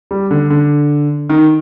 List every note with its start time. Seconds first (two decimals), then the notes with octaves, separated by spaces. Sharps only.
0.11 G3
0.31 D3
0.50 D3
1.30 D#3